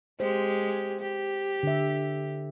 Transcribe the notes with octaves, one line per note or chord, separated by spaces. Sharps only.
G#3 G4 C5
G4
D3 E5